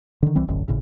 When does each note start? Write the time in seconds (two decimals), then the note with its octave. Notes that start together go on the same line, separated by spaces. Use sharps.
0.23 D3 D#3
0.35 C2 E3 G3 C4
0.48 E1 A1 F#2 D3
0.68 G#1 A2 C#3